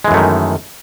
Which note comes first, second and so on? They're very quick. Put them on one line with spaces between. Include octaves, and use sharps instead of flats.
G#3 E3 F#2 A3 D#3